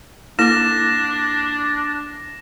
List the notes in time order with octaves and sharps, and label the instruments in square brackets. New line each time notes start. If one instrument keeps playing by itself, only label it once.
[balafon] A#3 [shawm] D4 [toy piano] E4 A4 D6 [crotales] A#6 E7